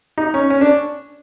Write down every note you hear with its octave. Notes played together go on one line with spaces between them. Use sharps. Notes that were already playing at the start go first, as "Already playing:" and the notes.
D#4
C#4
C#4
D4